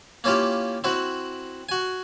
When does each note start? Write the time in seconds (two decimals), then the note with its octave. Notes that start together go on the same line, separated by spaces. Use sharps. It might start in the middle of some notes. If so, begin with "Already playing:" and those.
0.24 A#3 C#4 E4 F4 G4
0.84 C4 E4 F#4
1.69 F#4 G#5